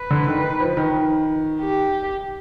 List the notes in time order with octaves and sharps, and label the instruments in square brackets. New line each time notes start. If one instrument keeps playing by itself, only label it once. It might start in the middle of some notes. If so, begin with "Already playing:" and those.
Already playing: [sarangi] B4
[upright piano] D3
D#3
D#3
F3
D#3
[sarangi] G4